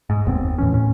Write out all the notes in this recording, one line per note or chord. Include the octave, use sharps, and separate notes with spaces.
G#2
F1 D#2 B3 C4
D#2 A2 E3 C#4
A2 C#4